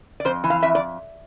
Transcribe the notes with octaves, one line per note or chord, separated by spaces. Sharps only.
D5
F2 C5
E3
F5
F2 E5
D5